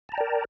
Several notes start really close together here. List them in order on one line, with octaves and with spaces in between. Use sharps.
A5 A#5 G5 D5 A#4